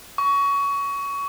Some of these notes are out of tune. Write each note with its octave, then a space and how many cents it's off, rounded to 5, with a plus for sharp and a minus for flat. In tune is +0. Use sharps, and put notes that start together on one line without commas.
C#6 +20